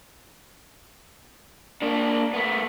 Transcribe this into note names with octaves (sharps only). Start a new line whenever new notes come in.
A#3 D4
A3 B3